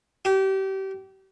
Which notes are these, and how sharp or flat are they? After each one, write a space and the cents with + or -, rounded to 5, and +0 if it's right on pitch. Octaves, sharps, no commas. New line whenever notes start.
G4 -30